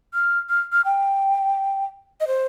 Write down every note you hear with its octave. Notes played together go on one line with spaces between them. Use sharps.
F6
F6
F6
G5
D#5
C5